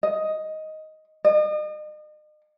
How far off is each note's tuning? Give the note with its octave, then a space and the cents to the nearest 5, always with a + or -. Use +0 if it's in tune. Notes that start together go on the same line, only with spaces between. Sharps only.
D#5 +10
D#5 -40